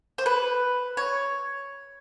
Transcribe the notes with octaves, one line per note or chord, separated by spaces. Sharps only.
C5
B4
C#5